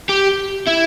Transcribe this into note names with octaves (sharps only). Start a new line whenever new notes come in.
G4
E4